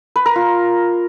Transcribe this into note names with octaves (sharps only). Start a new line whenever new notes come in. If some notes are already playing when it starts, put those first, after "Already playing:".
B4
A#4
F4